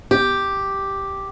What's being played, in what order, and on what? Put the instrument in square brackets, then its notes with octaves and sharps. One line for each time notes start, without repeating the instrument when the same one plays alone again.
[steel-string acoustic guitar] G4